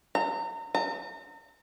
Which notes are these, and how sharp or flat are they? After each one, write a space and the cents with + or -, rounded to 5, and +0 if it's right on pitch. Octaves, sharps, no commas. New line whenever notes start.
A#5 -30
A#5 -40